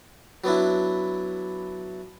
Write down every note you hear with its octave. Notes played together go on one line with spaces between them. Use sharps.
F#3 B3 D4 E4